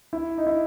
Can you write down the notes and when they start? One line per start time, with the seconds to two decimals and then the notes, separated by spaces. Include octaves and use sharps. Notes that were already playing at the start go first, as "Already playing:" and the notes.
0.13 E4
0.38 D#4
0.47 E4